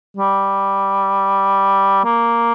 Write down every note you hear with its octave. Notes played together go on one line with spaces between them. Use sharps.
G3
A#3